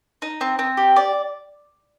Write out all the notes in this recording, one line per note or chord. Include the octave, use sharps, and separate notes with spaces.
D#4
C4
C4
G4
D5